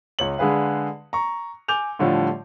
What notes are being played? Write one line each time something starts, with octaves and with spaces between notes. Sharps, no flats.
C#2 C#5 F#7
D3 G#3 G#4 B4 F5
A#5 C#6
G#5 D6 G6 F7
A2 D3 F3 G3 A3 F4